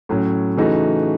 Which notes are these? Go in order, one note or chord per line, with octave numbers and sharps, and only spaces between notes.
A2 F#3 C#4
C#3 E3 A3 D#4 F#4